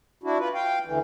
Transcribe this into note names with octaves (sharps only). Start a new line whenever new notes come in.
D4 E4 F#4
F4 B4
F5 G5
D2 E3